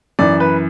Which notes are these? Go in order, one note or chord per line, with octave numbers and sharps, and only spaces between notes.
F#2 E3 D5
B4